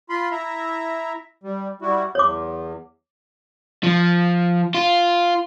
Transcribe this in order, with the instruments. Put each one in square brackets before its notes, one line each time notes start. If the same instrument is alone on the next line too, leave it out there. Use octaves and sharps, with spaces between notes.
[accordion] F4 B5 C6
E4 E5 A#5
G3
G3 E4 F#4
[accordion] E2 [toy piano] C#5 D6
[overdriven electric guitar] F3
F4